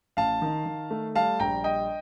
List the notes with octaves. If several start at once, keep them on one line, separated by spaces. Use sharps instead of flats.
A1 F5 A5
D#3
D#3
A3
G3 F5 A5
A#1 G5 A#5
G3 D#5 G5